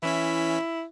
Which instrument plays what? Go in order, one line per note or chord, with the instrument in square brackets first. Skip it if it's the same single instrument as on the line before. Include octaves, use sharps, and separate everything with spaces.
[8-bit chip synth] E3 C#4 B6 [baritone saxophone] E4